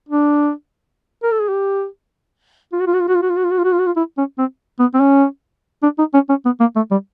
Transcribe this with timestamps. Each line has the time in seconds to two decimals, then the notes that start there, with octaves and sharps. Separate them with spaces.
0.09 D4
1.23 A#4
1.32 A4
1.40 G#4
1.48 G4
2.72 F4
2.80 F#4
2.87 F4
2.94 F#4
3.01 F4
3.08 F#4
3.15 F4
3.22 F#4
3.29 F4
3.37 F#4
3.44 F4
3.51 F#4
3.58 F4
3.64 F#4
3.72 F4
3.79 F#4
3.86 F4
3.96 E4
4.18 C#4
4.38 C4
4.79 B3
4.94 C4
5.00 C#4
5.83 D4
5.99 D#4
6.14 C#4
6.29 C#4
6.45 B3
6.60 A#3
6.76 A3
6.91 G3